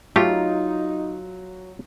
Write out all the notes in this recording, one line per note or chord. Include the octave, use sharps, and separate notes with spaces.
F#3 A3 D#4 F4 G4